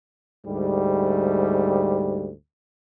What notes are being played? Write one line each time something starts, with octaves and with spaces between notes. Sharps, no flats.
D2 G#2 G3